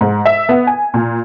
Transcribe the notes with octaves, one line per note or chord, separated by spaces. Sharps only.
G#2
E5
B3
G#5
A#2